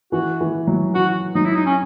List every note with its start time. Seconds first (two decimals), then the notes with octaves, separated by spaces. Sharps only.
0.12 E3 F#4
0.41 E3
0.67 F#3
0.94 E3 F#4
1.35 F#3 D#4
1.45 E4
1.55 D#4
1.66 C#4